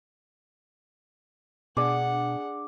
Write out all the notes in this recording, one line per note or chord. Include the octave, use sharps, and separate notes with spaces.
B2 D4 G#4 D5 F#5 D6